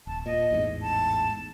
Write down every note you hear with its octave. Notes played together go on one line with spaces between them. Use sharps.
D#1 A5
A#2 D#5
A1 E2 G#2
A5